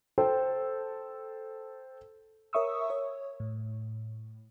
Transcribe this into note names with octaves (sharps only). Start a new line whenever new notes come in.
A4 C5 G5
A#4 C#5 E5 C#6 D#6 E6
C#5
A2